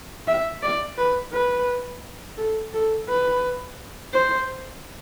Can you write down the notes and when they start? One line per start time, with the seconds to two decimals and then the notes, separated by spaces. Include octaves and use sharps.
0.27 E5
0.63 D5
0.98 B4
1.33 B4
2.37 A4
2.74 A4
3.09 B4
4.13 C5